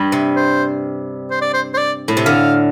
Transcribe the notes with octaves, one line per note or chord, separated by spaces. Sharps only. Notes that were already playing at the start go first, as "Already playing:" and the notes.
Already playing: G2 G3
C3
C5
C5
D5
C5
C5
D5
A2
C3
D3 F5